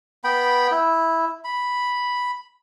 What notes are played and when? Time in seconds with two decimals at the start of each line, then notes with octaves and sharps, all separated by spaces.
0.24 B3 G5 B5
0.71 E4
1.44 B5